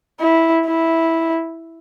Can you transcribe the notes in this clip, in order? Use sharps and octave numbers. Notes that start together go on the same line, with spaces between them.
E4
E4